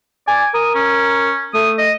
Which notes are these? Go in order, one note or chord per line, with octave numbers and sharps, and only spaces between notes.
D5 G#5
A#4 D#6
C#4
A3 D#6
D#5